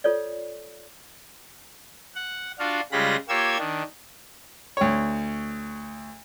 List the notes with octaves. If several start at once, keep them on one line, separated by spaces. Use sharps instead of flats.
F4 A4 C#5 D5
F#5
D4 F4 F#4 F5
C#3 G3 G#3 F4 B5 A#6
A#3 F4 G4 C#5 E6 G#6
D#3 D4
D2 C#5